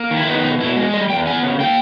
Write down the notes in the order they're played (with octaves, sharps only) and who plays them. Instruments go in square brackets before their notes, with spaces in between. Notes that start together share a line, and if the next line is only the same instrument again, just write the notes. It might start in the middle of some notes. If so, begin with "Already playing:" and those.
Already playing: [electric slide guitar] A#3
D#3
E4
B3 D#4
B2 D#4
B2 E4
G#3
G3 D#5
E2 G5
B3 G#5
C#3
A#3 G5